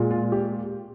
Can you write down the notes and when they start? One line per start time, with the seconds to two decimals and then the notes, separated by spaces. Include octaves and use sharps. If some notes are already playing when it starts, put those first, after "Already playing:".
Already playing: A#2 G#3
0.11 F4
0.32 G4